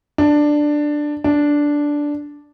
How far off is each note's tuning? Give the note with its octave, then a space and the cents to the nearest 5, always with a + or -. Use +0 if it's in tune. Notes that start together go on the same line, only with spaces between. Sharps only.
D4 +10
D4 -5